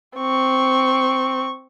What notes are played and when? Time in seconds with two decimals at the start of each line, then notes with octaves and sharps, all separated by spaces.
0.17 C4 C#6